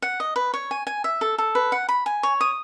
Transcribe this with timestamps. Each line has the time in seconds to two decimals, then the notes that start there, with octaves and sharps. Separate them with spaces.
0.02 F#5
0.20 D#5
0.36 B4
0.54 C#5
0.71 G#5
0.87 G#5
1.04 E5
1.21 A4
1.38 A4
1.55 B4
1.72 F#5
1.89 B5
2.06 G#5
2.23 C#5
2.41 D#6